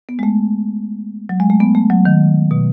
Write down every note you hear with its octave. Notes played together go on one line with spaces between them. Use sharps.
B3
G#3
A3
F#3
G#3
A3
B3
A3
F#3
D#3
B2